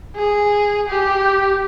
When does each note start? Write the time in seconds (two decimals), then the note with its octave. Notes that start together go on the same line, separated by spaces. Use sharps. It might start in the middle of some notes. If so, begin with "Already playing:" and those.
0.16 G#4
0.88 G4